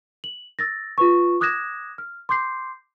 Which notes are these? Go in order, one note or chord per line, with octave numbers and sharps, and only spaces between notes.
F#7
E6 A6 A#6
F4 B4 C#6
D6 D#6 F#6 G#6 A#6 E7
F6
C6 D6 G6 C7